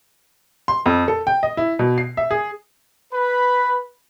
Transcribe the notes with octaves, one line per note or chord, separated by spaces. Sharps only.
C6
F2
A4
G5
D#5
E4
B2
C7
E5
G#4
B4 B5